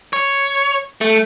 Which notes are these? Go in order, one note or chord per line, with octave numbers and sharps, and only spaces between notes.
C#5
A3